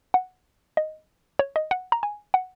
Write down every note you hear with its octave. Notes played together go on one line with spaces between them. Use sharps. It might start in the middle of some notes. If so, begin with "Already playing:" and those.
F#5
D#5
C#5
D#5
F#5
A#5
G#5
F#5